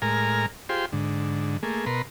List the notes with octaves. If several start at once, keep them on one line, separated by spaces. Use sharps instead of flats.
A2 G#3 A#4 G#5 A#5 F6
F4 G4 G#4 C5 G5 C6
G#2 D3
A3 A#3 G#4
B2 A#4 B4 C6